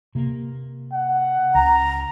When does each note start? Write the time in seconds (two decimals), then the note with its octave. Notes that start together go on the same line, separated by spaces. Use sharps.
0.15 C3 A#3
0.93 F#5
1.54 C#2 A#5